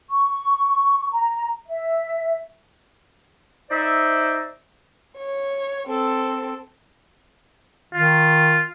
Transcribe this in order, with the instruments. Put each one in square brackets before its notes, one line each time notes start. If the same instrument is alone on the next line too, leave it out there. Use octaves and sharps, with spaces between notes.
[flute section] C#6
A#5
E5
[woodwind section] D#4 C5 D5 E5
[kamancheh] C#5
C4 A4
[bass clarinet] D#3 [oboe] F4